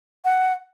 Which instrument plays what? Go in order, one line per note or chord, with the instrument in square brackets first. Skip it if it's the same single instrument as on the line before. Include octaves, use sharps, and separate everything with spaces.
[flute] F#5